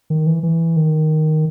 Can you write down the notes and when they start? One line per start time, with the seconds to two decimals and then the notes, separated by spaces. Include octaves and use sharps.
0.10 D#3
0.27 E3
0.43 E3
0.77 D#3